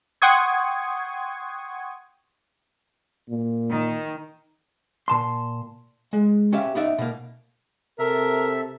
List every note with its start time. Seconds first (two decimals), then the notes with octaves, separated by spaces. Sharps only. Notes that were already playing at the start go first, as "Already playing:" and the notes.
0.22 F#5 G5 C6 C#6 D#6 G#6
3.29 A#2
3.69 D#3
5.08 A#2 A5 C6
6.13 G#3
6.53 C#4 G4 E5 F5
6.75 B3 D#4 D5 E5
6.98 B2 A#3
7.99 C3 A4 A#4 E5